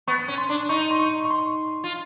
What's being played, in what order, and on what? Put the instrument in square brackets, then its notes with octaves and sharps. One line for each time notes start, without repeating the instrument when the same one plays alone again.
[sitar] B3 [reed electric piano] C#6
[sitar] C#4
[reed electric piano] C6
[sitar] D4
[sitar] D#4 [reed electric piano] C#6
[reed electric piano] C6
C#6
C#6
C6
[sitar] F4